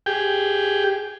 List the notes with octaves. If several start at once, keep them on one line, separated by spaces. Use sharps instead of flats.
G4 G#4 G5